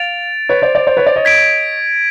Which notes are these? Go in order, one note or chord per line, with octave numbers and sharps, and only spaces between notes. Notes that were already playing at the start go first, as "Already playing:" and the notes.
Already playing: F5 A6 D7 F7
B4 C#5
C5 D5
C5 D5
C5 D5
B4 C#5
C5 D5
C#5 D#5
G#6 B6 D7